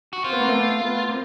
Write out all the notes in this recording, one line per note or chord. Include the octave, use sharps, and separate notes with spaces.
F#4
C4 F4
B3
A#3
A3 B3
A3 B3
A#3 C4